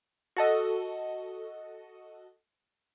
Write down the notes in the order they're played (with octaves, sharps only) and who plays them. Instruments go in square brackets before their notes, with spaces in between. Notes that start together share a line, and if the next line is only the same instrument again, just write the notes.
[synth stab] F#4 A4 D#5